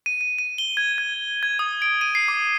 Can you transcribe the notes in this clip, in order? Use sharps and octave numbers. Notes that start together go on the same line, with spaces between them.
D#7
D#7
D#7
G7
G#6
G#6
G#6
D#6
D7
D#7
C7
D6